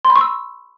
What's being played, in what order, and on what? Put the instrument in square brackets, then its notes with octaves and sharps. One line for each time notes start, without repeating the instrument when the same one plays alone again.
[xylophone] C6
B5
C#6
E6